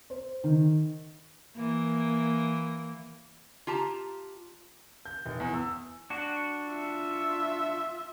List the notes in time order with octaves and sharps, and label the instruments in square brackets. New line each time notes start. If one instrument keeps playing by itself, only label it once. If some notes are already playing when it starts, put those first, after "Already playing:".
[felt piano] C5
D#3
[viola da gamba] E3 A#3
[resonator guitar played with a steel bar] F4 G4 A5 A#5
[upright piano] G6
F1
E2
E6
[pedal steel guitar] D4 F#4
[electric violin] F4 E5